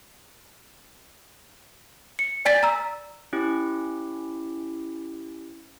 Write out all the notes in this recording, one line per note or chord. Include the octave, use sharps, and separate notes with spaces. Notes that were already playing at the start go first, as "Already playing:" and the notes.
C#7
D5 G#5 A6 B6
A#5 E6
C#4 E4 G4